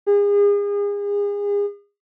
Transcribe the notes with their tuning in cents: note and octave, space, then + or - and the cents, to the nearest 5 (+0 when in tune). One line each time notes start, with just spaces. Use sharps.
G#4 -35